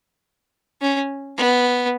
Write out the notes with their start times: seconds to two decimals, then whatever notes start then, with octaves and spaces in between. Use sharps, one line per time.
0.81 C#4
1.37 B3